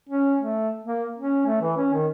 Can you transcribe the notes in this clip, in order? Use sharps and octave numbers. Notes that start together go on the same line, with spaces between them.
C#4
A3
A#3
C#4
A3
E3
C#4
D#3